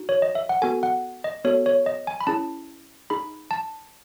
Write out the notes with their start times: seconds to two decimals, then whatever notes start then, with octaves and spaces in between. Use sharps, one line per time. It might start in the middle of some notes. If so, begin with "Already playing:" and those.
Already playing: D#4 F#4
0.09 C#5
0.22 D#5
0.35 E5
0.49 F#5
0.62 B3 F#4 A4 G#5
0.83 F#5
1.24 D#5
1.44 B3 F#4 A4 C#5
1.66 C#5
1.86 D#5
2.07 G#5
2.20 B5
2.27 C#4 E4 G#4 A5
3.10 D#4 G#4 B5
3.51 A5